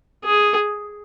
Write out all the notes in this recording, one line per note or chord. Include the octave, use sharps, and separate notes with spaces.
G#4